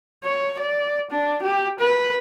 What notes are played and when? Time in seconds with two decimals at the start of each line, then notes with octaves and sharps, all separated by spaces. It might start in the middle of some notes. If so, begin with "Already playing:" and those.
0.24 C#5
0.59 D5
1.11 D4
1.43 G4
1.79 B4